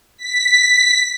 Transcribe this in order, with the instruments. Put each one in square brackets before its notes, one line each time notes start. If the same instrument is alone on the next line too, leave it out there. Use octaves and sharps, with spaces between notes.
[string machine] B6